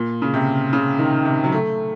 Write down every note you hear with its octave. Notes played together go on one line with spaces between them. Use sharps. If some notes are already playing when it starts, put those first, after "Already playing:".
Already playing: A#2
C#3
C3
C#3
D#3
C3
F#3
A3